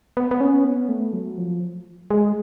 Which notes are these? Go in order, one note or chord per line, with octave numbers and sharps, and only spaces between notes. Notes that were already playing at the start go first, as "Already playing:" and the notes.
B3
B3
C#4
B3
A3
F#3
F3
G#3